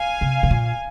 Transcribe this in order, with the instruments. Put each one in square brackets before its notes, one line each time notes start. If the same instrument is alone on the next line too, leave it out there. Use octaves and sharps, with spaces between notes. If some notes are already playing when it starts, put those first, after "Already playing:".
Already playing: [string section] F5 G#5
[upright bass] C3
C3
A#2